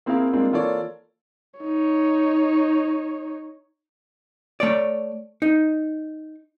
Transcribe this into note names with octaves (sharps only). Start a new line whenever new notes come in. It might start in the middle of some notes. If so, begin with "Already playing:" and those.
A#3 C4 E4 G#4 A#4 F5
G3 G#3 A#3 C4 D4 F4
E3 A#3 F4 A4 C#5 D5
D#4 C#5
A3 C#5 D5
D#4